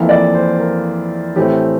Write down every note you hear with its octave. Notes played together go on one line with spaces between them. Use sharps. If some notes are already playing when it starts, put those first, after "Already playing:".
Already playing: F2 E3 A#3 E4
D5
C5
A#4
A2 E3 A3 C4 G4